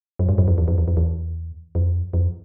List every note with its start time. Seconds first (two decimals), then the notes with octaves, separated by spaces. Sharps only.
0.19 F#2
0.29 G2
0.38 F#2
0.48 F2
0.58 E2
0.68 F2
0.78 E2
0.88 F2
0.97 E2
1.75 F2
2.13 F2